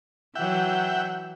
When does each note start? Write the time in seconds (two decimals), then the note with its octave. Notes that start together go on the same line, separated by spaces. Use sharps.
0.35 E3 F#3 E5 F#5 G5